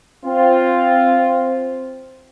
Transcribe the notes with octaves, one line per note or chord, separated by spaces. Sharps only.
C4 F4